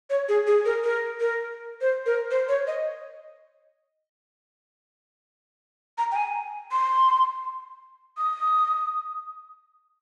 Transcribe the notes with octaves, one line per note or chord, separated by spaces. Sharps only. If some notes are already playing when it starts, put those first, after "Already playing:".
C#5
G#4
G#4
A#4
A#4
A#4
C5
A#4
C5
C#5
D#5
A#5
G5
G#5
C6
D#6